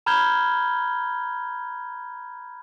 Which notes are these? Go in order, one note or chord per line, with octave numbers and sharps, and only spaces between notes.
A#5 B5 F6 G6 G#6 G7